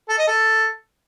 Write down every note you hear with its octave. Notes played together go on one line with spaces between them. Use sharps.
A4
D#5
A4